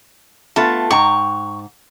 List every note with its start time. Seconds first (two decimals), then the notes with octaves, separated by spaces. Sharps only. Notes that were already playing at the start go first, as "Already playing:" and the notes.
0.56 A3 B3 F4 A5
0.91 G#2 G5 A#5 C#6